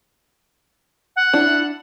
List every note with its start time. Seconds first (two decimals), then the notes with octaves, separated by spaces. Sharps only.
1.16 F#5
1.33 D4 E4